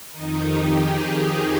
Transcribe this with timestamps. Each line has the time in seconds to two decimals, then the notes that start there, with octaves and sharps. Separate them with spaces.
0.10 F2 D#3 D#4
0.44 G4
0.77 G#4
1.10 G4